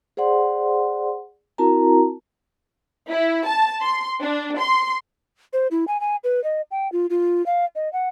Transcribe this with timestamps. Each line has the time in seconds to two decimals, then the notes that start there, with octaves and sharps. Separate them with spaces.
0.17 G#4 C5 D5 F#5 C6
1.58 C4 E4 F#4 A#4 A5 A#5
3.09 E4
3.46 A5
3.83 C6
4.22 D4
4.59 C6
5.53 C5
5.71 E4
5.88 G#5
6.00 G#5
6.24 B4
6.44 D#5
6.71 G5
6.92 F4
7.10 F4
7.46 F5
7.75 D#5
7.93 F#5